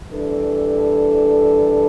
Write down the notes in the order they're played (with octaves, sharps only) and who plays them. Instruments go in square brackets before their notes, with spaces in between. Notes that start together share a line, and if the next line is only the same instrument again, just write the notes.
[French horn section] E3 G3 D4 A4